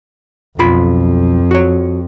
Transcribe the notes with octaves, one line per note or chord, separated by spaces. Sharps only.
B1 F2 F4 B5
F#4 C#5